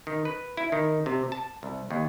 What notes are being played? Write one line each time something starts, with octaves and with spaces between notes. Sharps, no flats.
D#3
B4
E4
D#3
C3
A5
C2
D#2